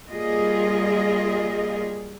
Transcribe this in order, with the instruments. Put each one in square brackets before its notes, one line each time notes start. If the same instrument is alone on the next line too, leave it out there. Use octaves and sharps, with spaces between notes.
[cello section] G3 A#3 F4 G#4 D#5